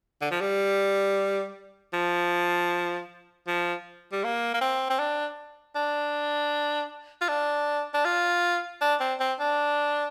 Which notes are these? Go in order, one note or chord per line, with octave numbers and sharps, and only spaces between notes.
D3
F3
G3
F3
F3
G3
A#3
A#3
C4
C4
D4
D4
F4
D4
D4
F4
D4
C4
C4
D4